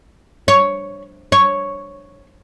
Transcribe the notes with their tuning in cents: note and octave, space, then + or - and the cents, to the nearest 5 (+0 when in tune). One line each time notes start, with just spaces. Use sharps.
C#5 +5
C#5 +0